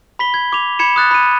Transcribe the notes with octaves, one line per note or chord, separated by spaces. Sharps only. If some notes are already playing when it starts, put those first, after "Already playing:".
B5 B6 G7
G#6
D6 F7
B5 G#6 C#7 E7
D#6 F#6 A6
B5 D#7